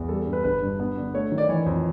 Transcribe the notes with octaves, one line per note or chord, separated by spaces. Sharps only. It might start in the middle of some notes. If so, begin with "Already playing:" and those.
Already playing: E2
G3 A4
A4
G2
B4
G1 B4
G2
B3
D3
A3 C#5
D#3
D5
E3 C#5
F2